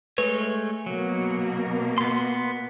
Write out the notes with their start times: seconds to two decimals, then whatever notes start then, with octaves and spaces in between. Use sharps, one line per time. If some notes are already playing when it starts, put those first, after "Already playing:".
0.18 G#3 A3 B4 C#5
0.86 B2 F#3 A#3
1.98 B3 C6